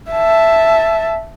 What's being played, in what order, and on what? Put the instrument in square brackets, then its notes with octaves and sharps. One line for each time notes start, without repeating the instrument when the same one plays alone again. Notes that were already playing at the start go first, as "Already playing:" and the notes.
[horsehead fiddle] E5 A5